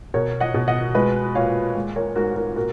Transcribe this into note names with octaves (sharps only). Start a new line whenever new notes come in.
B2 A#4 C#5
D#5 F#5
B2
D#5 F#5
G#3 B4 D#5
A#2 C#5 F5
G#3
A#4 C#5
G#2 F#4 A#4
F#4 A#4
A#2 F#4 A#4